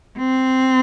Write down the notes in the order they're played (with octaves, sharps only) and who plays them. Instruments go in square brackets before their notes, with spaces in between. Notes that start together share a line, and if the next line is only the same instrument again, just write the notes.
[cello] C4